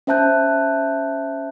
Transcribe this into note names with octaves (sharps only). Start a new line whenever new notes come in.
C#4 C5 E5 A5 F#6 G6